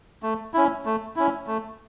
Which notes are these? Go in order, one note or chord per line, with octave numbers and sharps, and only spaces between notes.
A3
C#4 E4
A3
C#4 E4
A3